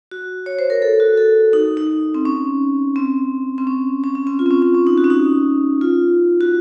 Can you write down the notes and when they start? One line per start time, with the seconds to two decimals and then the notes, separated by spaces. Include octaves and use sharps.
0.11 F#4
0.46 C#5
0.59 C5
0.70 A#4
0.82 A4
1.00 F#4
1.17 A4
1.53 D#4
1.77 D#4
2.14 C4
2.25 C#4
2.96 C4
3.58 C4
3.67 C#4
4.04 C#4
4.15 C#4
4.27 C4
4.39 F4
4.46 C4
4.51 C#4
4.62 C#4
4.74 C#4
4.87 D#4
4.97 F#4
5.04 C#4
5.10 D#4
5.81 F4
6.41 F#4